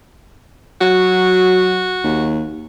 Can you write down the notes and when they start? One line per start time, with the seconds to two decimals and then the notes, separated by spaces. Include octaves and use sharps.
0.81 F#3 F#4
2.04 D#2